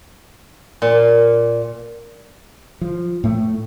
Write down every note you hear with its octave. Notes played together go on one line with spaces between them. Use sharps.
A#2
F3
A2 A3